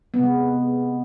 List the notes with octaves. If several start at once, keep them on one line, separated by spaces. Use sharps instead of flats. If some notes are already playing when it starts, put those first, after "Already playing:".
C3 G#3 B3